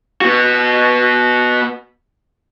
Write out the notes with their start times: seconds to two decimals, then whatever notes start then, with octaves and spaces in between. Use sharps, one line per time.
0.21 B3 F#4